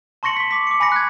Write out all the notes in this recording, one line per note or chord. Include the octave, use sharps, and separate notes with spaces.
A5 C6 C#6 A#6 C#7 F#7
C#6 B6
D6 B6
D6 C#7
G#5 B5 C#6 A#6 C#7
F#6 G#6